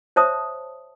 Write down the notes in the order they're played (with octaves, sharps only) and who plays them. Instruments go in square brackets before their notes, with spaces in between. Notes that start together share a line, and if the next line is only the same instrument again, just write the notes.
[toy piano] C5 C#5 E5 A5 D#6